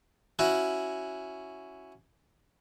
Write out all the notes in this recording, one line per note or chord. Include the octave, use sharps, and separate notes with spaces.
C#4 E4 F#4